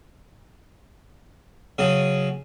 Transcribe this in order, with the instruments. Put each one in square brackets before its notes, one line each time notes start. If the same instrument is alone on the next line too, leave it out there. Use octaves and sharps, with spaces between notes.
[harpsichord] C#3 F#3 D#6